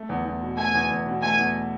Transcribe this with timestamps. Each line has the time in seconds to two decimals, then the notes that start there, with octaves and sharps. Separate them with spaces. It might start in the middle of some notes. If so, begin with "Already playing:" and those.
Already playing: A3
0.09 E2
0.25 E2
0.41 B2
0.57 A3 G#5
0.74 E2
0.90 E2
1.06 B2
1.22 A3 G#5
1.38 E2